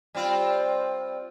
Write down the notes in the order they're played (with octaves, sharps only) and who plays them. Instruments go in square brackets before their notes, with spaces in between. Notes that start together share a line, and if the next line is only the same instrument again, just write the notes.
[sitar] G3 C4 F4